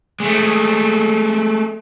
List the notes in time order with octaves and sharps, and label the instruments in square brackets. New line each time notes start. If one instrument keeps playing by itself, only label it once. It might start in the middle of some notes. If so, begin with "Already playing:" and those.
[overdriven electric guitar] G#3 A3